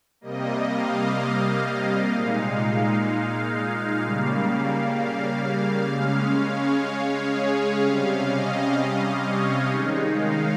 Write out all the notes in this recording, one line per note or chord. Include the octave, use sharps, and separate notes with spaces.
C3 G3 A#3 D#5
F5
A#2 G#3 D#4
F5
C#3 G3 A#3
F5
C#3 G#3 C#4 F5
C#5
C#5
G#4
G#4
C3 G3 C#4 F5
D#5
D#5
C#5
D#3 G#3 D#4
F5